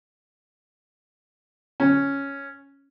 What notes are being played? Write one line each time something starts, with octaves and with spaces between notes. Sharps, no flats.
C#4